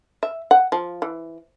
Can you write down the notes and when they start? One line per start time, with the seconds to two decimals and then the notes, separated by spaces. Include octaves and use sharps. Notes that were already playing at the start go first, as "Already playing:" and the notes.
0.23 E5
0.51 F#5
0.72 F3
1.02 E3